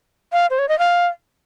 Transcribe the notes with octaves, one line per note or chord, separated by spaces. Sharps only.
F5
C5
C#5
D#5
F5